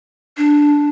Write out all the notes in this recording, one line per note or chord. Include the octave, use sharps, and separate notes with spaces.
D4